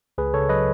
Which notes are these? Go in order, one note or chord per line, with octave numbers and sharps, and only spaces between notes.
C#2 G#4 B4
C#3 A4 C#5
F#3 B4 D#5